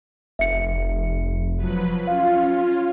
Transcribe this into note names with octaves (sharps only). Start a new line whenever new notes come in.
F1 E5 C#7
F3 F#3 B4
C#4 F4 F5